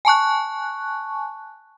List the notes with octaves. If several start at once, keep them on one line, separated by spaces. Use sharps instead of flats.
G#5 A5 C#6 F#6